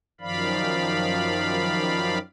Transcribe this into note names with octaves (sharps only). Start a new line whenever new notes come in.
F#2 D#3 F3 D5 F5 B5